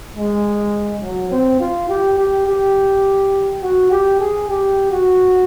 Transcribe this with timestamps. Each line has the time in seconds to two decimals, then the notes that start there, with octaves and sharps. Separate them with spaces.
0.16 G#3
1.03 F#3
1.31 C4
1.60 F4
1.89 G4
2.18 G4
2.47 G4
3.62 F#4
3.91 G4
4.20 G#4
4.49 G4
4.92 F#4